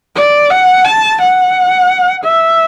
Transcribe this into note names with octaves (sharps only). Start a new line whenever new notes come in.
D5
F#5
A5
F#5
E5